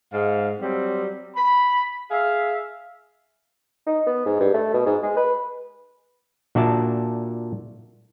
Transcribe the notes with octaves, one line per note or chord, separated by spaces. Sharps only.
G#2 F5
F#3 G3 C4
B5
G#4 E5 F5
D#4
B3
G#2
G2
A3
B2
G#2
G#3
B4
A#2 D4 F#4 D5 E5 A5